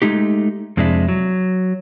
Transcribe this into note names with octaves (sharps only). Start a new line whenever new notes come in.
G#3 A3 D#4 G4
F2 C3 G#3 D4 E4
F#3